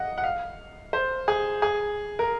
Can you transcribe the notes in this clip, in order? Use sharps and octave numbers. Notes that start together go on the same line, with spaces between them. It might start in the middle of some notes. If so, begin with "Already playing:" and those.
Already playing: D#5 F#5
F#5
F5
C5
G#4
G#4
A#4